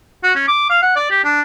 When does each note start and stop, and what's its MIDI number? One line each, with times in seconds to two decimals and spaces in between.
0.23 0.33 66
0.36 0.46 61
0.48 0.66 86
0.70 0.77 77
0.82 0.96 78
0.96 1.06 74
1.10 1.22 67
1.24 1.41 62